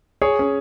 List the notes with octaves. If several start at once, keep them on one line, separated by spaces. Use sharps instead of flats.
G#4 C#5
C#4